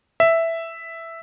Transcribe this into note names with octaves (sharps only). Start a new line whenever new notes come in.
E5